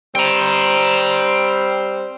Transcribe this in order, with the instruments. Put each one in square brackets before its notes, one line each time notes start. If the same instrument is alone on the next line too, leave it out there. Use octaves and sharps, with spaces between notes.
[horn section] G3 C4 C5 [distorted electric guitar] G5 A#5